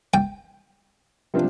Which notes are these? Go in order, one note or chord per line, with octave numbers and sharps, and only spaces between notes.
G5
C3 F3 D4